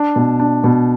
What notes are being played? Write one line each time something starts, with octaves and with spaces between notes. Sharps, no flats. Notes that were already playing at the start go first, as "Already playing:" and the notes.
Already playing: D4
B2
D4
B2